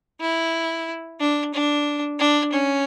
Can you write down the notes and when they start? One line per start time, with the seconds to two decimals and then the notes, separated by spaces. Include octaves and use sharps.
0.20 E4
1.20 D4
1.54 D4
2.19 D4
2.52 C#4